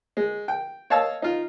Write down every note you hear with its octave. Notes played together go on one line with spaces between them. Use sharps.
G#3
G5
C#5 D#5 F5 A5 E6
D#4 F4